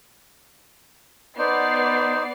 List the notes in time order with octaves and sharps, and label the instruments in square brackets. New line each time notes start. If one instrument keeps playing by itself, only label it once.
[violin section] B3 D5 C7 [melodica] D#4 C5